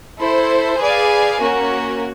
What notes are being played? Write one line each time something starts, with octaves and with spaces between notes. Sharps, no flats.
E4 A4 C5
G#4 B4 D5 F5 G#5
A#3 C#4 F#4 A#4